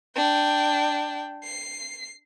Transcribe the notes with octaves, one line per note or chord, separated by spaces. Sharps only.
D4 G5
C7